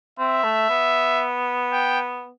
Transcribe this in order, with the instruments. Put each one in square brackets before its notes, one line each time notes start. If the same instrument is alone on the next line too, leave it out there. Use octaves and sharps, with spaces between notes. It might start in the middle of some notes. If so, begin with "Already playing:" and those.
[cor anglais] C4 [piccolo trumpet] E5
[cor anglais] A3
B3
[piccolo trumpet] G5